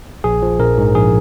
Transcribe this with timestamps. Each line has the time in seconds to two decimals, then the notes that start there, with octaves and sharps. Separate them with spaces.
0.24 A#1 G#4
0.42 F3
0.60 A#1 A#4
0.78 G#2
0.95 A#1 G#4